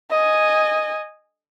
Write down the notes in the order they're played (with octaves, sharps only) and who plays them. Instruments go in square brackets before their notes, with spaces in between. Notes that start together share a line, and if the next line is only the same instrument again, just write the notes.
[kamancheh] D#5 G#5